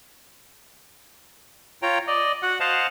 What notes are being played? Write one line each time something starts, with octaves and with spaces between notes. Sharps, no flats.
F4 C#5 G5 A#5
D5 D#5
F#4 F#5
C5 D#5 F5 F#5 A5